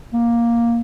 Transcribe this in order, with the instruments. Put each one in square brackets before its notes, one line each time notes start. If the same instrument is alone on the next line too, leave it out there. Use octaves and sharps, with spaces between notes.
[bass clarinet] A#3